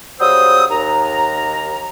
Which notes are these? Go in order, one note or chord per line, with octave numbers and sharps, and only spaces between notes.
C#3 F#3 G3 C5 D#6 E6
D#2 A#5